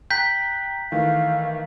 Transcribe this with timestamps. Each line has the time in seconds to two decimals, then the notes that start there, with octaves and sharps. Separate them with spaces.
0.10 G5 A#5 F#6 G6 B6
0.92 D#3 E3 A3 F5